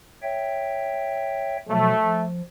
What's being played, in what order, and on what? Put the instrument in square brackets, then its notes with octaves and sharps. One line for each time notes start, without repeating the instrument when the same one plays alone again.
[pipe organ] C#5 E5 G5
[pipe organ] B2 F3 F#3 [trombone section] A3
[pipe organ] F3